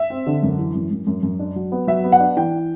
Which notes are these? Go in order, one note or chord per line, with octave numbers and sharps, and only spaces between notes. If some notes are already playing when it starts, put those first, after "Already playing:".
Already playing: E5
C4
D3
F#2
E3
F#2
F#2
F#2
F#2
D4
F#3
B3
F#3 E5
B3
F#5
D4
E3 G5